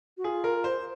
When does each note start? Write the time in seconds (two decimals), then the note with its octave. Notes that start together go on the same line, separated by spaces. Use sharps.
0.17 F#4
0.24 F4 G#4
0.44 A#4
0.64 C5